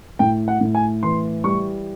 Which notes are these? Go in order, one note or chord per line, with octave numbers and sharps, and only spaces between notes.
A2 G5
F#5
A2
G#5
E3 C6
G3 C#6